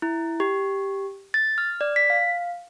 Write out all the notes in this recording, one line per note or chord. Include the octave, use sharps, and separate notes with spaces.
E4
G4
A6
F6
D5
B6
F5